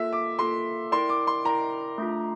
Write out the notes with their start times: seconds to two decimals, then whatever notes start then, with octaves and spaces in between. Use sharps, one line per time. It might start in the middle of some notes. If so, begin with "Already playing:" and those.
Already playing: A#3 F4 A4 E5
0.13 D6
0.39 A#3 F4 A4 C6
0.91 E4 A#4 D5 G5 C6
1.09 D6
1.27 C6
1.45 E4 A#4 D5 G5 A#5
1.98 A3 D4 F4